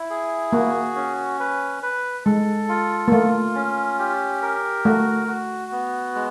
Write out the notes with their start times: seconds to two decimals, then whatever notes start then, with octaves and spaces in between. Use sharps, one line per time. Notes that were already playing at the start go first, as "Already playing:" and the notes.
Already playing: E4
0.10 G#4
0.53 A#3 F#4
0.96 C#4
1.40 B4
1.83 B4
2.25 G#3 A4
2.69 F4
3.08 A#3
3.12 A3 F4
3.55 C#4
3.99 G4
4.42 A#4
4.85 A3 F#4
5.28 F#4
5.72 B3
6.15 G#3